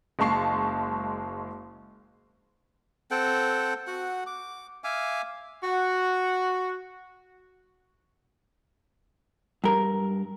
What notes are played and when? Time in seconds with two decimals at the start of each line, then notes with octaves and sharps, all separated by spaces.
0.19 F#1 G#3 F5 A5 C#6 C7
3.11 C4 A4 F#5 G5
3.87 F#4 F#5
4.26 D6
4.84 E5 F5 G#5 D6
5.63 F#4 F#5
9.64 G2 A#4